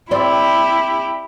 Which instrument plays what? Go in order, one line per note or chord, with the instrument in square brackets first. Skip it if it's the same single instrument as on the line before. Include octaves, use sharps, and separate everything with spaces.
[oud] C4 D5 [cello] E4 G4